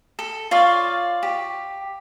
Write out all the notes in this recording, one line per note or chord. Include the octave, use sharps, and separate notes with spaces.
A4
F4 C#5 D5 F5
G4